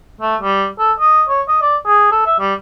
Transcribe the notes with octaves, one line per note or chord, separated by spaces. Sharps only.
A3
G3
A4
D#5
C#5
D#5
D5
G#4
A4
E5
G3